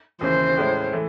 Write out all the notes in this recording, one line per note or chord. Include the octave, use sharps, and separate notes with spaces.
D#2 C#3 E3 C5
A2 G#3 C#4 E4
E3 A3